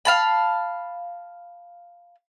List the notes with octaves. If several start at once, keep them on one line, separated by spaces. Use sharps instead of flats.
F5 A5 B5